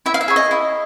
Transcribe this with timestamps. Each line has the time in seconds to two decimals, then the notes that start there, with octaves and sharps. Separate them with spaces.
0.06 E4 E5
0.14 F5
0.21 E5
0.28 G#4 C#5
0.36 D#5
0.51 E4